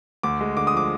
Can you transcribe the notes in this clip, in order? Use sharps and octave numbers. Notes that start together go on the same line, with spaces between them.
D2 D6
G#3
D3 D6
D#6
F3 D6